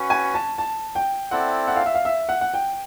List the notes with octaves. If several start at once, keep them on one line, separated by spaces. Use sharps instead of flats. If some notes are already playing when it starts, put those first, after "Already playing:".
Already playing: C#4 F#4 B4
G#5
A5
A5
G5
C4 E4 A4 D5 F#5
F#5
F5
E5
F5
E5
F#5
F#5
G5